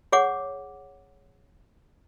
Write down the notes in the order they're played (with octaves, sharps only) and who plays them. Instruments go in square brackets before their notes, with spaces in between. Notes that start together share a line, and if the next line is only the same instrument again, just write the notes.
[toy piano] G#4 C#5 F#5 D6